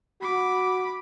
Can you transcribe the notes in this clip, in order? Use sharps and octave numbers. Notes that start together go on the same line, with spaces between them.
F#4 B5 D6